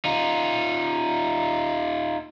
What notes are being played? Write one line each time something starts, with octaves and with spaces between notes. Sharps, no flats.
D#4 F4